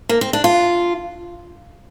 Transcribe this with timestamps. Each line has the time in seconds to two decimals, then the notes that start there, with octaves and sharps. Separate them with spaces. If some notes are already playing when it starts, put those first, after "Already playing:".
0.09 A#3
0.21 C4
0.33 D4
0.44 F4